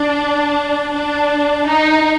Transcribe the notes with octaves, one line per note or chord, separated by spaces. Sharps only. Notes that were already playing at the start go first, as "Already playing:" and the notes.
Already playing: D4
D4
D#4